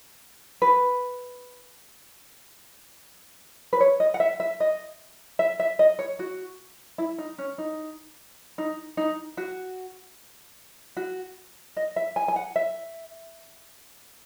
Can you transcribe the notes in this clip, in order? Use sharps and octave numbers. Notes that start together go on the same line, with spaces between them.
B4
B4
C#5
D#5
F#5
E5
E5
D#5
E5
E5
D#5
C#5
F#4
E4
D#4
C#4
D#4
D#4
D#4
F#4
F#4
D#5
E5
G#5
G#5
F#5
E5